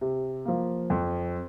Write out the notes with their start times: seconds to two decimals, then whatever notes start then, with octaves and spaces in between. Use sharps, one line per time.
0.01 C3
0.45 F3 A#3
0.90 F2